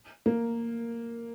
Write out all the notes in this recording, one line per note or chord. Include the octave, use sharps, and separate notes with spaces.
A#3